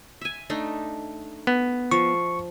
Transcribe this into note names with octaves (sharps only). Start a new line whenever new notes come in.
E5 G#5
A3 D4 D#4
B3
F3 C#6